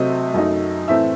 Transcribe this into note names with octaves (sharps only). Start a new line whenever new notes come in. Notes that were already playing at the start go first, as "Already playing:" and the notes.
Already playing: C3 F#3 A3 C4 D#5
F#2 F#3 A3 D#4
A2 E3 A3 C4 E5